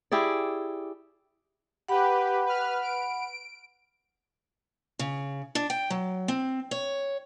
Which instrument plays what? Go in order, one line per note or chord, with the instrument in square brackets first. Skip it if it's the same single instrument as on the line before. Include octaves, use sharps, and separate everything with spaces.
[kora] E4 G4 G#4 D5
[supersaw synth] G4 B4 [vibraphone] F#5 B5
[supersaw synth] B4 F6
D7
[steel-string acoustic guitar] C#3
D4
G5
F#3
C4
C#5